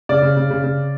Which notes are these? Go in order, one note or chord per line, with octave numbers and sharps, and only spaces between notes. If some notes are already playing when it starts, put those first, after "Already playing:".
C#3 D5
C#3
C#3
C#3
C#3